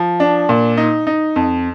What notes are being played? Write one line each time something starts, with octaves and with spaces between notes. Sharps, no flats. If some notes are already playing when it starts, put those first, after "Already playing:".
Already playing: F3
D4
A#2
D#4
D#4
F2